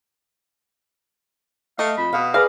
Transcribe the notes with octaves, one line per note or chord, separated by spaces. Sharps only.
A3 D#5 F5
F2 B5
B2 F5 D#6
G#4 A#4 B4 D5 F5